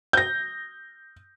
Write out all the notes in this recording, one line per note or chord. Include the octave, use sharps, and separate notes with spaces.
G6 A#6